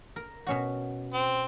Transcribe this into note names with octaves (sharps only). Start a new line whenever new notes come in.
A#4
B2 C#4 F#4
C4